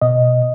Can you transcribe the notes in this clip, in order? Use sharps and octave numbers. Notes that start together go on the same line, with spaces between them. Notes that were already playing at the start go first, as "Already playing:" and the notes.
B2 D#5